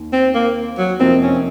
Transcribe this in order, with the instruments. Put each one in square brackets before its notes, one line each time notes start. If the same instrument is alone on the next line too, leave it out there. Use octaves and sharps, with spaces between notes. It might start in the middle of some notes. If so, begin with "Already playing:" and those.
Already playing: [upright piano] D#2 D#3
[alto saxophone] C4
A#3
F#3
[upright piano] F2 C3 F3 A#3 D#4 [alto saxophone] C4
[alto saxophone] C#4